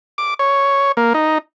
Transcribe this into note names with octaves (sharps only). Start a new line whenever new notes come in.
D6
C#5
A#3
D#4